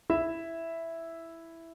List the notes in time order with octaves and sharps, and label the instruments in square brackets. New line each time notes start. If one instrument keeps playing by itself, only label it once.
[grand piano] E4 E5